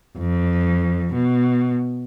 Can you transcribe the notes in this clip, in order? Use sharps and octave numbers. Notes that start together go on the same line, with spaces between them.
F2
B2